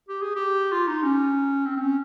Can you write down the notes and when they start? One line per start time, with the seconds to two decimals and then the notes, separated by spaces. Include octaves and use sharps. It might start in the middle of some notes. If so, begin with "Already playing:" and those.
0.09 G4
0.22 G#4
0.36 G4
0.72 F4
0.87 D#4
1.03 C#4
1.66 C4
1.77 C4
1.81 C#4